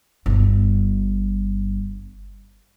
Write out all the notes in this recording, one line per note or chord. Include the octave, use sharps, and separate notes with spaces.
G1 G2